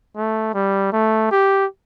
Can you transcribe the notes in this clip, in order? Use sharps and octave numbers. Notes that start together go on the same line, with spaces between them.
A3
G3
A3
G4